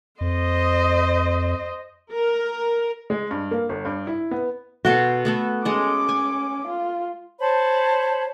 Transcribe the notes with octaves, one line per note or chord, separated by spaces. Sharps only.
F2 C5 D#5
A#4
G#3
G2
A#3
G1
G2
E4
B3
B2 F#4 A4 C6
A3 B3 A4
G#3 C#4 A4 D#5 D6
G#5
F4
C5 C#5 A5 B5